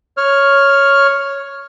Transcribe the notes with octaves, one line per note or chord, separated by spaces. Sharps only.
C#5 F6